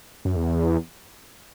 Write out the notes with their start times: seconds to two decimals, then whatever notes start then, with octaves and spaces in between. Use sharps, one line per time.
0.25 F#2
0.36 E2